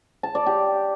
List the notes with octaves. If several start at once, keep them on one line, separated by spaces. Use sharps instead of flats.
A5
D5
G4